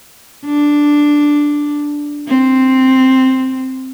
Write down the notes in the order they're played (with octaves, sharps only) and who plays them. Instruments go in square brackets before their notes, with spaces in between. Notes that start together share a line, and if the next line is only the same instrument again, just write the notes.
[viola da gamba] D4
C4